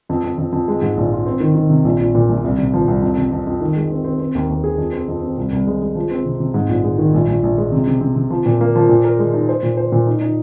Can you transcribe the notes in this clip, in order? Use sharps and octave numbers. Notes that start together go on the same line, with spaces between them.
F2
F2
F2
F2
G#3
G#2
A#1
F4
C4
D#3
D#3
C3
A#1
A#1
A#2
A#1
C2
C3
F3
C2
F2
C3
F2
F2
D#3
G#3
C4
C4
C4
D#2
D#2
G#4
F2
C4
F2
C4
C2
C2
G#3
G#3
F3
C4
C3
C3
G#2
A#1
G#3
D#3
A#1
A#1
A#1
G#3
C3
C3
C3
C3
F3
A#2
A#3
F3
A#2
A#4
G#3
D#4
C5
A#2
C5
A#2
D#4
D#4